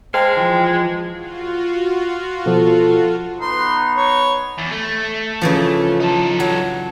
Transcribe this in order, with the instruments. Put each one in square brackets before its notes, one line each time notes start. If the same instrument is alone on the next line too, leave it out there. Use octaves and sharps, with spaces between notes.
[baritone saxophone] G#3 [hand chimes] C5 A5 [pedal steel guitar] F5 [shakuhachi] G5
[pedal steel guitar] E3 F3
[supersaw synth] F4 F#4
[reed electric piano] B2 F3 [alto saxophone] A4
[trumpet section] B3 D#4 B4 [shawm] C6
[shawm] C#5
[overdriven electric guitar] E2
A3
[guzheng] C#3 E3 F3
[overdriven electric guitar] D#4 A4
[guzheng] F#3